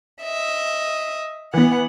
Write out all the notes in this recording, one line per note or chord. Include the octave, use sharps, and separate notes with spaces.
D#5 E5
E3 B3 F#5